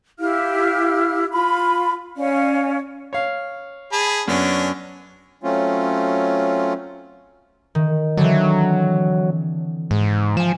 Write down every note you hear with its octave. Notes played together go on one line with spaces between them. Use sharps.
E4 G4 F5 F6
F4 B5
C#4 D5 F5
C#5 F5
G#4 A5 B5
F#2 B3 C#4 D4
F#3 A3 C4 C#4 F4
D#3
D3 E3 F#3 C4
G#2
F3 G#5 E7